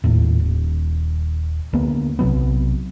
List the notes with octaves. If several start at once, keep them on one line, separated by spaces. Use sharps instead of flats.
D#2 A2
D#1
D2 G#3 A#3 B3
B1 C3 F#3 B3